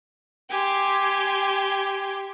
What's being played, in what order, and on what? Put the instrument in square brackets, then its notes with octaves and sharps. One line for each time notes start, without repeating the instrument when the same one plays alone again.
[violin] G4 [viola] G#5 C6